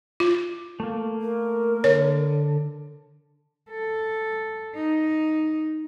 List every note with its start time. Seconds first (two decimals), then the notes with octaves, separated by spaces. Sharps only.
0.20 F4
0.80 A3 A#3
1.21 A#4
1.84 D3 C#5
3.71 A4
4.75 D#4